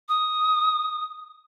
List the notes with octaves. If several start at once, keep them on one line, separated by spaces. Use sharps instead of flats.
D#6